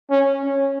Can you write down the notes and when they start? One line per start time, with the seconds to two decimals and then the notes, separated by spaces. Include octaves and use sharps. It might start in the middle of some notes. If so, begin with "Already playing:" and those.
0.11 C#4
0.44 C#4